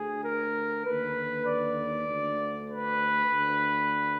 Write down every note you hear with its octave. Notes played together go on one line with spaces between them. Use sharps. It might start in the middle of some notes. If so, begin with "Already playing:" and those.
Already playing: D2 D3 G#4
A#4
D#2 D3 B4
D5
D2 D3
B4
D2 D3